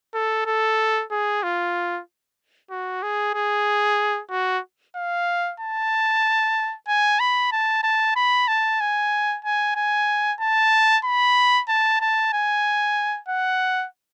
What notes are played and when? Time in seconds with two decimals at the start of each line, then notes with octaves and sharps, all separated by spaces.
0.14 A4
0.46 A4
1.11 G#4
1.43 F4
2.71 F#4
3.03 G#4
3.35 G#4
4.31 F#4
4.96 F5
5.60 A5
6.88 G#5
7.20 B5
7.52 A5
7.83 A5
8.16 B5
8.48 A5
8.80 G#5
9.45 G#5
9.76 G#5
10.40 A5
11.05 B5
11.69 A5
12.01 A5
12.33 G#5
13.28 F#5